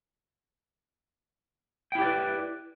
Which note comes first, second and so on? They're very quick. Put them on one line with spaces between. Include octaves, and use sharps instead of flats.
G5 E4 G4 D5 B4